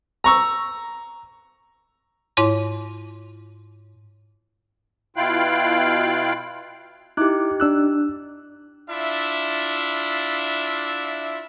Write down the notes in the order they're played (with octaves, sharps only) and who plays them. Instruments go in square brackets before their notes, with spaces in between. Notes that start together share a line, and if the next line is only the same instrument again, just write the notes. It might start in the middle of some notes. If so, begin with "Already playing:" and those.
[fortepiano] A#5 C#6 E6
[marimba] G#2 E4 C#5 C6
[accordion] B2 E4 F4 F5 G5 F#6
[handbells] D#4 G4 [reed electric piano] E4 D6 F#6
[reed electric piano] D4 E6 F#6
[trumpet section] D4 E4 F4 E5